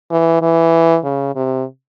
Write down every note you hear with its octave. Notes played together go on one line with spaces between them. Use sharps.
E3
E3
C#3
C3